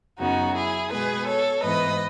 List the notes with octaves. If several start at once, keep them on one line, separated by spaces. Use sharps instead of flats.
F#2 C#3 F#3 B3 D#4 F#4
E4 G#4
B2 G#3 B3 G#4 B4
A4 C#5
G#2 E3 B3 B4 D#5